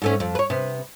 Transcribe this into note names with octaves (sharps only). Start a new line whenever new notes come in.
G#2 A3 C#4
F2
B4 C#5
C3 B3